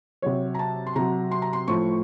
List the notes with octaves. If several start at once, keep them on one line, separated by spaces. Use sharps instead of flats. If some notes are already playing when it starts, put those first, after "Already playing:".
C3 F#3 C#5
A#5
A5
C6
C3 F#3 A#5
C6
A#5
C6
A2 F3 C#6